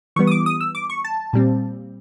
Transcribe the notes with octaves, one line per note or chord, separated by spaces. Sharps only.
E3 G3 B3 C#6
D#6
D6
D#6
E6
D6
C#6
A5
A#2 G3 C4